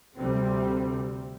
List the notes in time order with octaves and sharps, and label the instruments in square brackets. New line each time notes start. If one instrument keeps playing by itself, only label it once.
[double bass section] D2 C3 G3 C4